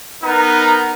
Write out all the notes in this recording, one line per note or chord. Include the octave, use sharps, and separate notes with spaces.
B3 D#4 A#4 B4